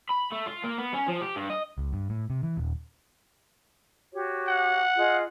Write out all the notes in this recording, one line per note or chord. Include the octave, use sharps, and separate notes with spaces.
B5
A3
F4
A#3
B3
C#4
F3
G4
G2
D#5
C#2
G2
A2
C3
E3
D#1
F#4 G4 C#5
F#5
F4 G#4 D#5